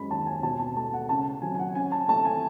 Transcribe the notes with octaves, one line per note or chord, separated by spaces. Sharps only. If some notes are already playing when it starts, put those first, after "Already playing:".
Already playing: F#2 G#3 B5
D#2 A5
G#5
B2 A5
A5
A3 A5
F#5
C#3 A5
F#3 G#5
G#5
F#5
C#4 G#5
A5
A3 A5
G#5